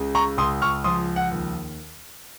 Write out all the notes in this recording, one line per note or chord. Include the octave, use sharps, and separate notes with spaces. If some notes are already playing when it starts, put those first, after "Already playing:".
Already playing: C#2 C#3
A#5 C#6
C#2 C6 D#6
C#6 F6
F3 C6 D#6
F#5
D#2